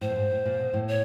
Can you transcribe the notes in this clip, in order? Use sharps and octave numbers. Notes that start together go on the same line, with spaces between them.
A2 C5
G2
G#2
A2
A#2
B2
A2
C#5